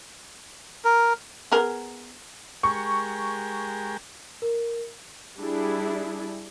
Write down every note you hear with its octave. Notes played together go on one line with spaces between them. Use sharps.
A#4
B3 G#4 A#4
G#3 G4 A#4 C#6
A#4
G3 D4 E4 G#4